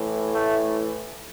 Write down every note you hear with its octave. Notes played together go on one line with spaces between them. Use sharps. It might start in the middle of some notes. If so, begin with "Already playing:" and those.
Already playing: A2 E3
A3